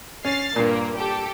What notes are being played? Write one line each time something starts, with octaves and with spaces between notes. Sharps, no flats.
C#4 F6 A6 C7
G2 A#2 A#3
G4 A4